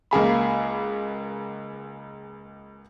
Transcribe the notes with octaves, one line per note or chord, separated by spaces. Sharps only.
C#2 A#3 G#4 B5